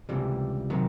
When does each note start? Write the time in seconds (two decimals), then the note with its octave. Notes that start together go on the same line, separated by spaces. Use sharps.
0.09 C#2 C3 E3 G3
0.70 C3 D#3 F#3